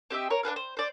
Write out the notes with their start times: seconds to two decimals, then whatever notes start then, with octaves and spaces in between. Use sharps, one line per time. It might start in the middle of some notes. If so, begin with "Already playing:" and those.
0.10 C4 G4 D#5 E5
0.30 A#4 C#5
0.43 D4 G#4 B4 F5
0.56 C5
0.77 C5 D5